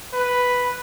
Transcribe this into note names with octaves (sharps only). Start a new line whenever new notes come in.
B4